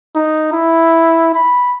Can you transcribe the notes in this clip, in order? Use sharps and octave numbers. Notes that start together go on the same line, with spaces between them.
D#4
E4
B5